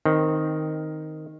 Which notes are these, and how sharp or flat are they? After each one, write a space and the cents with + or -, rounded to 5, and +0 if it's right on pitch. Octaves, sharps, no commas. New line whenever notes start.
D#3 +0 C4 +0